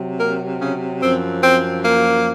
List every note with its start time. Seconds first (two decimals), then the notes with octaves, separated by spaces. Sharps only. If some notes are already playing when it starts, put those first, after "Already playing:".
Already playing: C3 F#3
0.19 A#3 A#4
0.60 C#3 C#4
1.01 F#2 F3 C4
1.42 C4
1.83 A#3